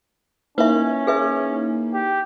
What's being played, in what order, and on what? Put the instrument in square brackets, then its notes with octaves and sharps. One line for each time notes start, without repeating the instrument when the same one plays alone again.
[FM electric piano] A#3 D#4 E4 [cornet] C#4 [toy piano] B4 E5
[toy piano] G#4 B4 E5
[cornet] G4